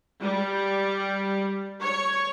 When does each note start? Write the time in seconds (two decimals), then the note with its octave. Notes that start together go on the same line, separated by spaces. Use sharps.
0.21 G3
1.80 C#5